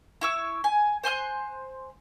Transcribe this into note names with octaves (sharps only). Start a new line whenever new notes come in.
E4 C#6 E6
G#5
C5 G#5 C6 F#6